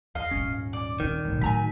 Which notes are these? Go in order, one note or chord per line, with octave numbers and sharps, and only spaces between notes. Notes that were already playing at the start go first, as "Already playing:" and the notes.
E2 D#5 F5
D#1 G#2 D#3 C#4
D5
D#3 C4
A1 D#2 B2
A2 F#3 G#5 A#5 B5